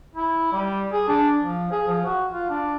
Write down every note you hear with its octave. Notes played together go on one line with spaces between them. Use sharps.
E4
G3
G#4
D4
F3
G#4
F3
F#4
F4
D4